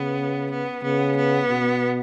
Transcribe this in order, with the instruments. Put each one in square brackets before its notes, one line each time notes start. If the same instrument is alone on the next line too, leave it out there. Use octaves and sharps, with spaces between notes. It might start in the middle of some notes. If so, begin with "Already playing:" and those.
Already playing: [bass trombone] C#3 [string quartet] B3
[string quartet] B3
[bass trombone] C#3 [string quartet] B3
[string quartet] B3
[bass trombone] B2